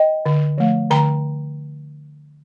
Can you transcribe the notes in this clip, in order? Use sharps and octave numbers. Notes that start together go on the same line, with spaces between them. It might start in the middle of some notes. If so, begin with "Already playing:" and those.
Already playing: D#5 G5
D3
F3 A3
D3 G5 A#5